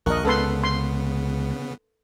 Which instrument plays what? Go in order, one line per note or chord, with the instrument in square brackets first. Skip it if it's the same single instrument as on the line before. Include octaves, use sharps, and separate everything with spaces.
[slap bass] A#1 D#2 [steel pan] A#4 D#5 [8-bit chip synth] C#6 F#6
[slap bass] C#2 [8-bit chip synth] C#3 B3 [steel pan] A4 B4 C6
[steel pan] C6